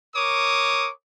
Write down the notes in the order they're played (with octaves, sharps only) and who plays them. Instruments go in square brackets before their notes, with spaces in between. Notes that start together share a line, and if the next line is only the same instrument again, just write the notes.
[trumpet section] A#4 C#5 D6 D#6